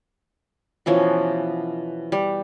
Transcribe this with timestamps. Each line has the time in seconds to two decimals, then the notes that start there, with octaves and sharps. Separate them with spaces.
0.86 B2 E3 F3 C#4
2.12 G3